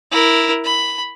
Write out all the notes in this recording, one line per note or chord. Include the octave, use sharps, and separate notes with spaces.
E4 A#4
B5